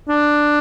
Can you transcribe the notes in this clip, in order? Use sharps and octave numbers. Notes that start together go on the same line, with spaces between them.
D4